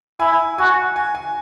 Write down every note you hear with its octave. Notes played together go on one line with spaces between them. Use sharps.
E4 G#5
F#4 G#5
G#5
G#5